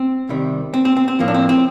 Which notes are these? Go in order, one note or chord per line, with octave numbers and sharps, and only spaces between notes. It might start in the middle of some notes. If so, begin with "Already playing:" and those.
Already playing: C4
C2 C3 D#3 G3
C4
C4
C4
C4
A2 F3 A#3
D4
C4
C4